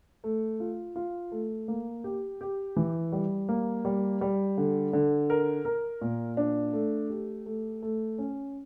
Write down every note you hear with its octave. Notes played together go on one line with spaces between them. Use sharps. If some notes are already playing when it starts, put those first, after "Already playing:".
A3
F4
F4
A3
A#3
G4
G4
E3
G3
A#3
G3
G3
D3
D3
A#4
A#4
A#2
D4
A3
G4
A3
A3
C#4